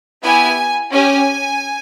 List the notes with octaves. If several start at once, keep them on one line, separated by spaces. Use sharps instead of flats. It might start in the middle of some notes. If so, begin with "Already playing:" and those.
B3 E4 G4 G#5
C#4 G4 G#5